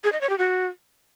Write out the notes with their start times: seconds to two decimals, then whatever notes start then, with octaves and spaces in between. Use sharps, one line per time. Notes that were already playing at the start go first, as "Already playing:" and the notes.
0.04 G#4
0.12 D#5
0.21 C#5
0.30 G4
0.38 F#4